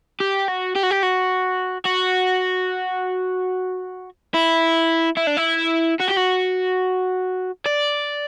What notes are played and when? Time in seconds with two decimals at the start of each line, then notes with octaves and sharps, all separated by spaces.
0.20 G4
0.48 F#4
0.75 G4
0.83 F#4
0.91 G4
1.03 F#4
1.85 F#4
4.34 E4
5.17 E4
5.27 D4
5.37 E4
6.00 F#4
6.08 G4
6.17 F#4
7.66 D5